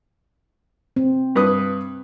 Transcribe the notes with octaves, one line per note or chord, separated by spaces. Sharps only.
C4
G2 B4 D#6